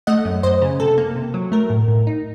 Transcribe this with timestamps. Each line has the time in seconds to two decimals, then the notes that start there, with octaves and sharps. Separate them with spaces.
0.07 A3 D#5 F#5
0.25 F#2
0.43 F#2 C5 D#5
0.62 C#3
0.80 C3 A4
0.98 A#3
1.16 C3
1.34 F#3
1.52 A3 A#4
1.70 A2
1.88 A2
2.07 D#4